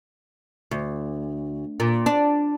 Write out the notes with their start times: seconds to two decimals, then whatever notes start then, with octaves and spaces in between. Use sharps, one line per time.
0.71 D2
1.80 A#2
2.06 D4